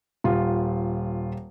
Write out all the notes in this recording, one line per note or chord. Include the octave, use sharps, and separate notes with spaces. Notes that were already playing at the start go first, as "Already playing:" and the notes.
D#1 F4